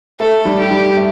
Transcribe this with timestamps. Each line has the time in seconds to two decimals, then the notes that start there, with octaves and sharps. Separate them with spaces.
0.20 A3 A4
0.45 G3
0.59 G4
0.71 G3
0.96 A3